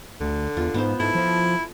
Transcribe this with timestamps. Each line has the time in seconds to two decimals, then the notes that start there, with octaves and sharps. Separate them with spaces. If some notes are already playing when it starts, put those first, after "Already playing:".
0.21 D2 D3
0.57 E2 F4
0.74 G#2 B3 C5
1.00 G#2 E4 A4
1.15 F3